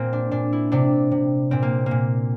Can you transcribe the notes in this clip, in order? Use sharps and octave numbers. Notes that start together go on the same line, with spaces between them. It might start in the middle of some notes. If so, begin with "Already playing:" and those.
Already playing: A#2 A#3 C4
D4
A#2 D4
E4
C3 D4
C3
A#2 C4
A#3
A#2 A#3